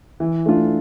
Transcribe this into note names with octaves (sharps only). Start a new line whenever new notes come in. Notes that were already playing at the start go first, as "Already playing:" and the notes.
E3
A3 D4 F4